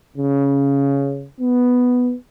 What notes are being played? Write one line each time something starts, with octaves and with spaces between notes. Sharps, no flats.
C#3
B3